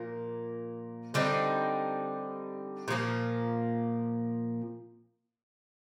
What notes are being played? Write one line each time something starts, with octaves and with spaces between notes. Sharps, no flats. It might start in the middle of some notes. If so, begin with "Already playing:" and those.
Already playing: A#2 F3 A#3
D3 G3 C4 D#4
A#2 F3 A#3